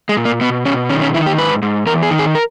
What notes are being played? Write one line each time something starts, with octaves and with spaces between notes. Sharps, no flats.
G#3
A#2
A#3
B2 B3
B2 C#4
D#3 C#4
C#4
D#3 E4
G4
G#2 B4
G#2
E2 A#4
G#4
D#3
G#4
A#4